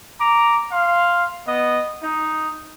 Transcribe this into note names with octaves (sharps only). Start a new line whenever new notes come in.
A#5 D6
F5 C6
B3 D#5
D#4